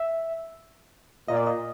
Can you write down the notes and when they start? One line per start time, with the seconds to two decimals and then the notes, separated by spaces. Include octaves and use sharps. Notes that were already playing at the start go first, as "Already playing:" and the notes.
Already playing: E5
1.28 A#2 D#5
1.37 D5
1.46 D#5